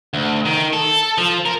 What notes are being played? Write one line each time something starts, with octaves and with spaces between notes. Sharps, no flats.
D2
D#3
A4
F3
A#4